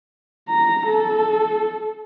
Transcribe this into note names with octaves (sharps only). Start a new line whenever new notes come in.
A#5
A4